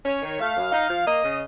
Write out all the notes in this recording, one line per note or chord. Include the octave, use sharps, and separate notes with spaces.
C#4 C#5
D#3
A3 F5
F#2
D#4 F5
F3
A#3 D#5
C#3